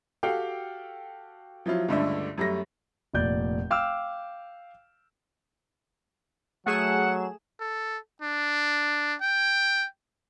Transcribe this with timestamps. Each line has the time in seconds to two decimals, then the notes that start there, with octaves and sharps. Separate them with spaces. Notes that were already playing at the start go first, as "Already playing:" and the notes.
0.23 F#4 G4 A4 F5 G5
1.66 F3 F#3 E4 F4
1.88 C#2 G2 D3 A3 D5 E5
2.38 F#2 G3 A3 A#6
3.14 F1 A#2 D5 G6
3.71 F5 G5 D6 E6 F6
6.67 F#3 A3 G#4 F#5 E7
7.60 A4
8.22 D4
9.22 G5